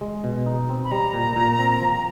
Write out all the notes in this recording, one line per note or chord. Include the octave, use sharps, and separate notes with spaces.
G#3
B2
D#4
C4
B5
G3 A#5
A#2
A#2
C4
F3